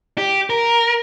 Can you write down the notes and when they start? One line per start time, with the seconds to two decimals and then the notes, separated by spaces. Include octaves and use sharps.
0.18 G4
0.50 A#4